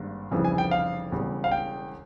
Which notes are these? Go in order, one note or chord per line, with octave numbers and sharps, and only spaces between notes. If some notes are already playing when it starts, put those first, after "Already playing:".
Already playing: G#1 G2 G3 A#3
F1 F2 C#3 E3 G3
G#5
G5
F5
E1 E2 C#3 G3
F5
G5